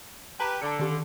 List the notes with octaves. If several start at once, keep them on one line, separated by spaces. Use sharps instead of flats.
G4 B4 A5 A#5
D3 A5 C#7
D#3 G4